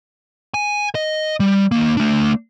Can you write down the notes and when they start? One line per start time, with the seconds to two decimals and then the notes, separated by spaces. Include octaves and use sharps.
0.54 G#5
0.95 D#5
1.40 G3
1.72 D#2 A#3
1.97 A3 D4